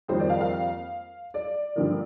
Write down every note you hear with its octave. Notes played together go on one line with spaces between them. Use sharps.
F2 D#3 G3 A#3 C5
D5
F5
F5
D5
G2 D3 F3 A#3